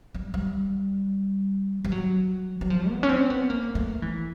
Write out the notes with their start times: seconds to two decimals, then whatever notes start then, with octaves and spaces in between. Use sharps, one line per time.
0.15 G3
0.34 G3
1.85 G3
1.92 F#3
2.61 F#3
2.70 F3
2.89 B3
3.03 C#4
3.09 C4
3.30 B3
3.50 A#3
3.75 A3
4.02 E3